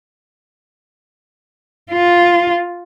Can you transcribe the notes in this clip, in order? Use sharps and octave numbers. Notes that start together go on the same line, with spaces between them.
F4